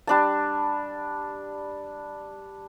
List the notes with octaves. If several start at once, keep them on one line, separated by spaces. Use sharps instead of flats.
G3 D4 A5